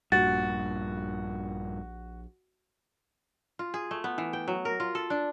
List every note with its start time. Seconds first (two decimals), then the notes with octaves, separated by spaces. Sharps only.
0.12 A#1 G2 A#2 F#4 A6
3.59 F4
3.74 G#4
3.91 A3
4.04 B3
4.18 E3
4.33 G5
4.48 F#3
4.65 A#4
4.80 F4
4.95 A4
5.10 D4